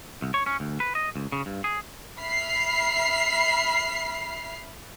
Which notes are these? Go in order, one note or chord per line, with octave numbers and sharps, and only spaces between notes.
C2
C#5
C#4
D2
B4
D#5
C#2
C#3
G2
G#4
E5 B5 F6 C7